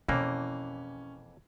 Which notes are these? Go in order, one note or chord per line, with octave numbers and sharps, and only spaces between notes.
F2 B2 E3 A#3 C#4 E4